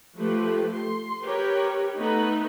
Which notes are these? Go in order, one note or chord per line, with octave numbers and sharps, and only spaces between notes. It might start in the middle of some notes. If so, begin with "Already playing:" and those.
F3 A3 G4 B4
C6
G4 A#4 B4 C#5
A3 B3 D#4 B4